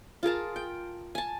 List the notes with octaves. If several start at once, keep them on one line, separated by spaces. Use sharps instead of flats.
F4 G#4 A#4 A5
G5
G#5 A5